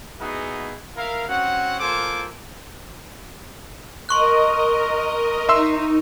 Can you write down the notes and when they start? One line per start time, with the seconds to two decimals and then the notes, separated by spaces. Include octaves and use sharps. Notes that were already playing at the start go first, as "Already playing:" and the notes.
0.20 B3 D#4 E4 F#4 G#4
0.97 E4 A#4 F5
1.28 C4 C#4 F#4 F#5
1.80 A#3 F4 A4 C5 G#5 D6
4.09 A#4 D#5 C6 C#6 F#6
5.49 D#4 E5 C6 E6